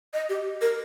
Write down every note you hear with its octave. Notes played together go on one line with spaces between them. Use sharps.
D#5
G4
A#4